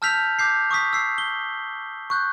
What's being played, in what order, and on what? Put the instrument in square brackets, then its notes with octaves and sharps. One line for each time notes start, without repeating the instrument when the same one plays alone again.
[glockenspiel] A5 E6 F6 G6 B6 F7
D6 G6 C7
C#6 D#6 B6
E6 C7
G7
C#6 F#6 G6